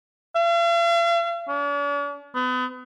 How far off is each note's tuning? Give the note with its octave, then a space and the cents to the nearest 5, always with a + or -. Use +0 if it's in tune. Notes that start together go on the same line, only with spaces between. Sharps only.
F5 -45
D4 -45
B3 +35